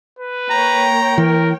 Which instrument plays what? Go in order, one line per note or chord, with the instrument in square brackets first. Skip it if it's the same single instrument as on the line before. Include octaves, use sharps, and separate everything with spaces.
[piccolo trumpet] B4
[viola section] A#3 C#5 G5 [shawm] A#5
[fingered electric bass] E3 [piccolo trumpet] A#4